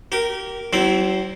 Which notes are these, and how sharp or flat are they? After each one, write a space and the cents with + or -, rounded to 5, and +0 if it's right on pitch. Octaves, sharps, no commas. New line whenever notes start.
G4 -30 A#4 +0
F#3 +45 C4 +0 E4 +0